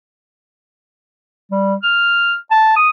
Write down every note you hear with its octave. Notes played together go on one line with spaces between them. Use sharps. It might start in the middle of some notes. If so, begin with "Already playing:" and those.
G3
F6
A5
D#6